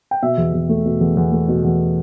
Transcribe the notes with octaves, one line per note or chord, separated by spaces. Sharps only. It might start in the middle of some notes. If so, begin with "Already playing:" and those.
G5
B2 E5
E2
E2
A3
B2
E2
E2
A3
B2
E2